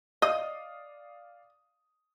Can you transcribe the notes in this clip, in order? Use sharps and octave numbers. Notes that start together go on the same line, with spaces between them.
D5 D#5 F5 D#6